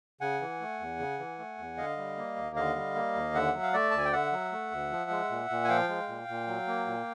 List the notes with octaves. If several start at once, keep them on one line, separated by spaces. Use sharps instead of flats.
C#3 F#5 G#5
E3
A3
E2
C#3
E3
A3
E2
D3 D#5 F5
G3
A#3
D#2
D3 D#5 F5
G3
A#3
D#2
D3 E5 F#5
F#3
F5
A3 D5 E5
D2 A5
G#5
G5
D3 E5 F#5
F#3
A3
D2
F3
G#3
A#2
A#2
G#5
F3 F5 G5
G#3
A#2
A#2
F#3
A#3
A#2